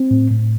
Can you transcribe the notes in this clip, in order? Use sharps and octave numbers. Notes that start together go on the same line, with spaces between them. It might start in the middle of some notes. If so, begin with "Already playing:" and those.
Already playing: C4
A2
A2